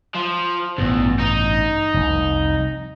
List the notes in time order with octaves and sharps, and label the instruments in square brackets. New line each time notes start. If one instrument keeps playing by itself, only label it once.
[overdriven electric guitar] F3
[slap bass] A1 G2 B2 [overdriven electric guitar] E2
[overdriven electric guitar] D#4
[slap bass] F1 C2